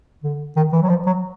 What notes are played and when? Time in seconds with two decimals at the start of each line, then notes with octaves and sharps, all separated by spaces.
0.24 D3
0.56 D#3
0.73 E3
0.82 F#3
0.89 F3
1.06 F#3